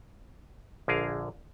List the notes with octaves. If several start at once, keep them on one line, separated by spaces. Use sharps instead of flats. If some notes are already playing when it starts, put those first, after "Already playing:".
A#1 D3 G#4 A#4 F5